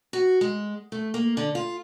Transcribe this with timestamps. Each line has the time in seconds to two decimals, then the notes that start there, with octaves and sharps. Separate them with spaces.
0.13 F#4
0.41 G#3
0.92 A3
1.14 A#3
1.37 D3
1.55 F4